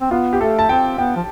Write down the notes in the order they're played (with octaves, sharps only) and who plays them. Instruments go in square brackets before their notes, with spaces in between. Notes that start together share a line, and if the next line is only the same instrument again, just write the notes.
[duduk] C4
[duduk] B3 [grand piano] F4
[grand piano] G4
[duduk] A3 [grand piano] A4
[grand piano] A5
[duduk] C4 [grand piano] G5
[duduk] B3 [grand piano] G5
[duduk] F3